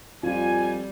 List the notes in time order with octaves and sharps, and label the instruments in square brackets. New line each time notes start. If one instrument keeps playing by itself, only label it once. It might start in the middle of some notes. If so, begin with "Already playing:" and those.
[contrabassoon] F2 [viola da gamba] G3 [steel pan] F4 [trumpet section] G#5